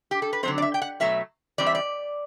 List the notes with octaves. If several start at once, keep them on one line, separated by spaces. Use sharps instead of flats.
G4
A4
B4
D3 F#3 C4 C5
D5
E5
G5
F#5
B2 F#3 A3 E5
E3 G3 C4 D5
E5
D5